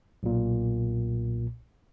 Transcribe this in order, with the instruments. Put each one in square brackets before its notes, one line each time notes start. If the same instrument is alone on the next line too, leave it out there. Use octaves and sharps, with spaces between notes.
[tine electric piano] B1 A#2